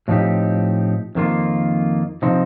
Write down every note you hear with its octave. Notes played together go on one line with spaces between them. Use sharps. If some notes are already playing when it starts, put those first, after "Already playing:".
A2 F3 C4 D#4 G4
F2 D#3 A#3 F4
C3 F3 C4 D#4